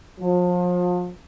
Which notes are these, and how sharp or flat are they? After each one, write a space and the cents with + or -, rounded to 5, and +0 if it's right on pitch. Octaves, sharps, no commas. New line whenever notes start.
F3 +35